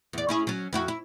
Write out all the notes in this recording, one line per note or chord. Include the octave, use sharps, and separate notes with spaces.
E2 D5
C#4 E4 G#4
F#3 C#4
F2 E4 F#4
E4